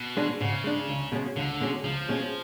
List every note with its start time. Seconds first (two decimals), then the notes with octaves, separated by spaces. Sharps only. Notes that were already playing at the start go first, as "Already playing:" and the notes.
Already playing: B2
0.17 G#3 D4
0.41 G#2 C#3
0.64 G#3 D4
0.89 C#2
1.12 B2 G#3 C#4 G#4
1.36 C#2 D3
1.60 B2 G#3 C#4 G#4
1.84 C#2 F3
2.09 B2 G#3 C#4 G#4